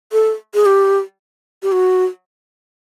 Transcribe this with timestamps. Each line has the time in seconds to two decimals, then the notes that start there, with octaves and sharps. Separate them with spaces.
0.12 A4
0.55 G#4
0.66 G4
1.63 G4
1.72 F#4